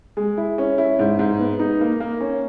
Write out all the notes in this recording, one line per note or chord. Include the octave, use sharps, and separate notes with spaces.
G#3
E4
C#4
E4
G#2
G#2
B3
D#4
A#3
A#3
C#4